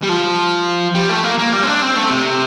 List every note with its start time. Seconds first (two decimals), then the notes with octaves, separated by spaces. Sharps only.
0.02 G3
0.09 F3
0.95 G3
1.09 A3
1.24 A#3
1.38 A#3
1.53 G3
1.63 C4
1.67 D4
1.81 C4
1.96 A3
2.10 C3